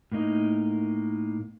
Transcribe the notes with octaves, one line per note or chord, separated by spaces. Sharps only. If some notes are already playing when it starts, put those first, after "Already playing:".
A2 A#3 D#4